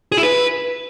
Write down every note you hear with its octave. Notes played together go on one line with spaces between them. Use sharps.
G#4
E4
B4